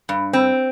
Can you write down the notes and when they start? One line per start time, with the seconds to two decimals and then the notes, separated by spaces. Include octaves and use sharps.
0.09 G2
0.33 C4